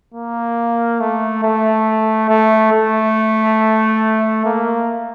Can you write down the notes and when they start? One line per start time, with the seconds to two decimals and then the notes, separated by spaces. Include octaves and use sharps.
0.14 A#3
1.00 A3
1.43 A3
2.29 A3
2.72 A3
4.45 A#3